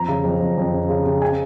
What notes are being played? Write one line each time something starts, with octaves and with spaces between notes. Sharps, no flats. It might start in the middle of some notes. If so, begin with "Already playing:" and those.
Already playing: F2 A#5
C#3
F2
F2
F2
C#3
C#3
C#3
G#5